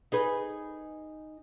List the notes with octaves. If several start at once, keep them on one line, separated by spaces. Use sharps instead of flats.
D#4 G#4 B4